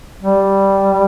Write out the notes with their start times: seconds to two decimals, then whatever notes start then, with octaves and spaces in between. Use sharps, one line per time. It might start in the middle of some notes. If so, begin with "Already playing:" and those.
0.23 G3